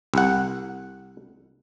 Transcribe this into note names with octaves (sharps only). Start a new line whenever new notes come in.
C2 F#5